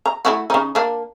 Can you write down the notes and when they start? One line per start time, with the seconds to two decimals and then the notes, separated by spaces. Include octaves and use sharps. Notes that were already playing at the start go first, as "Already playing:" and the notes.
0.06 A#5
0.25 A3 E4 F#4
0.50 C#3 D#4
0.75 A#3 D4